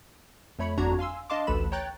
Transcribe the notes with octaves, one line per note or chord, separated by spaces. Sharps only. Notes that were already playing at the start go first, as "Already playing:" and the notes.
F2 A3 C#5 B5 C#7
G1 F2 D4 F#4 A#5 G#6
F5 G#5 C6 E6
D4 D#5 F5 A5 C6 D6
A1 D2 A4 B4 B5 E7
C#5 G5 A#5 F#6 G6 A6